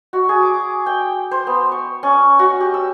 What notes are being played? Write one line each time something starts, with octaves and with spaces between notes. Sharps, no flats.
F#4
G#4
D6
G5
C5
B3
C#6
C#4
F#4
G4
E6